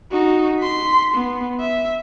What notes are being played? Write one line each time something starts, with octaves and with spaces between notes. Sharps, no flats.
D#4 F#4
C6 B6
B3
E5